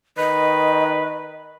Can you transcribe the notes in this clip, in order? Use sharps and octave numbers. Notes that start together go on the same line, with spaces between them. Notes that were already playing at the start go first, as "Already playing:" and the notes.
D#3 B4 D#5